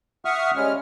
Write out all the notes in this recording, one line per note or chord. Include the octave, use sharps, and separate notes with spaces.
E5 F#5 C#6 D#6 F6
G3 G#3 C#4 F6